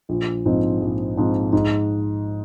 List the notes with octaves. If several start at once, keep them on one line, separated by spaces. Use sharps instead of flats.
A#1
G#2 F3 C4
A#1
G#2 F3 C4
G#2